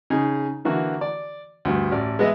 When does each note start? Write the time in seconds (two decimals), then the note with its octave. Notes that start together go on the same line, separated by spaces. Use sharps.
0.10 C#3 D#4 G#4
0.65 D3 E3 A#3 F#4
1.01 D5
1.65 D2 G2
1.92 A1 D5
2.19 G#3 B3 D#5 E5